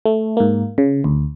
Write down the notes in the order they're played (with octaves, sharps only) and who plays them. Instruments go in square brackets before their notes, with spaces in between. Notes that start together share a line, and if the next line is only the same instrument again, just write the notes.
[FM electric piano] A3
G#2 A#3
C#3
D2